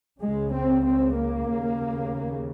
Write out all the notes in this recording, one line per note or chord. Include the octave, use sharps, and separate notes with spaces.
C#2 C#3 G#3
C4
C4
A#3
D#2 C#3